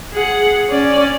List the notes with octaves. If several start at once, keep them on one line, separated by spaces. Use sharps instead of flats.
G#4 F#5
C#4 D5